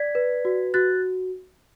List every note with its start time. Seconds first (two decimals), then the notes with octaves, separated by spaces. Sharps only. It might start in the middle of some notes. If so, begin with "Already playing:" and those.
Already playing: D5 G#6 B6
0.15 B4
0.45 F#4
0.74 F#4 F#6 A6